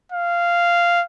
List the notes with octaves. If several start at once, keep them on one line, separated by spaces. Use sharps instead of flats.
F5